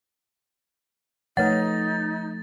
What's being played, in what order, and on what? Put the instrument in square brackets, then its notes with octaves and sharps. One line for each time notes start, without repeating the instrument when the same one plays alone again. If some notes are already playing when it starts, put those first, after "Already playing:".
[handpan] F3 A3 [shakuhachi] D#4 [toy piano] B4 C#5 F#5 [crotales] A6